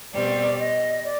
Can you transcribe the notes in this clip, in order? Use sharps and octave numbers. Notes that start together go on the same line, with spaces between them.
B2 G3 C4 D5
D#5
D5